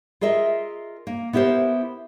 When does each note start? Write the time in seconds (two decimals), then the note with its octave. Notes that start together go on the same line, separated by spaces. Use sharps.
0.21 F4 G#4 A#4 D#5 E5
1.07 A#3
1.33 B3 E4 G4 A#4 C5